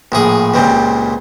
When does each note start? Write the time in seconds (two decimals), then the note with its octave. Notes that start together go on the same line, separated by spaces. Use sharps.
0.12 A#1 A2 G#4
0.54 C#2 A#2 G3 C4